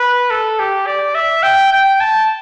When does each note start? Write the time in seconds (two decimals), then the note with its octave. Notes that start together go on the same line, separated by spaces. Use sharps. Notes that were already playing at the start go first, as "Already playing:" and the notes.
Already playing: B4
0.31 A4
0.59 G4
0.87 D5
1.15 E5
1.43 G5
1.72 G5
2.01 A5